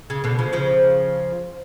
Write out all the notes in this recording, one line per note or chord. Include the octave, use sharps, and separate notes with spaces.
C#3
B2 D3
C#3 F3
C#3 F3